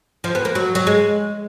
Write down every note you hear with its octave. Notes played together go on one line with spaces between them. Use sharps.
F3
B3
A#3
F#3
F#3
G#3